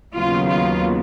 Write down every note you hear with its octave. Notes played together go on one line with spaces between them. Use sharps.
D#2 C#3 F#3 B3 F4
F4